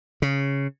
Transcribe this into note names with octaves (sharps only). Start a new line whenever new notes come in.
C#3